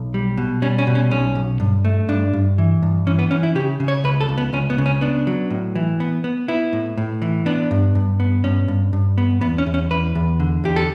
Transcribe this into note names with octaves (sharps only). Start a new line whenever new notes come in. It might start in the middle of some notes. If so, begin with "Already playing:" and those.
Already playing: B1
G3
B2
G3 C#4
C#4
B2
C#4
B1 C#4
B1
G2
A3
G2 D4
G2
E3
G2
E3 C#4
B3
E3 C#4
E4
C#3 G4
C#3
C#5
C#2 B4
A4
C#2
B3
C#2 C#4
B3
C#3
C#4
B3 D4
F#3
A2
E3
B3
B3
B3 E4
A2
A2
E3
B3 D4
G2
G2
B3
G2 C#4
G2
G2
B3
E2 B3
C#4
E2
C#4
E2 B4
E2
D3
E2 G4
A4